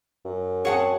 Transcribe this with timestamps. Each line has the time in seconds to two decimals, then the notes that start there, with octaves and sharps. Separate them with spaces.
0.25 F#2
0.65 C4 G#4 C#5 F#5 A5